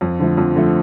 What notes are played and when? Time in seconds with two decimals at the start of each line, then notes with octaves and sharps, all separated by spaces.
0.01 F2
0.19 D3 F3 A3
0.37 F2
0.55 D3 F3 A3